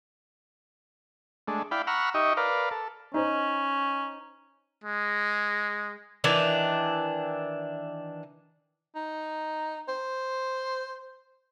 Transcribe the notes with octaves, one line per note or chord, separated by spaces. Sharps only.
G#3 A3 D4
E4 D5 F5 G5 B5
F#5 A#5 B5 C#6 E6 F6
D#4 G4 D#5 E5 C#6
A#4 B4 D5 F5
A4
C#4 D#4 C5
G#3
D#3 E3 D4
D#4
C5